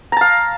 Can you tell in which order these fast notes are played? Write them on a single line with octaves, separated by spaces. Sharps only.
A#5 A5 F5